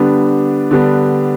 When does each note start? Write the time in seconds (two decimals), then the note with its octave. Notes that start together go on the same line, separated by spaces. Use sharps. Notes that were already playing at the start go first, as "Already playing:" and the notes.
Already playing: D3 G3 B3 D4
0.71 D3 G3 B3 D4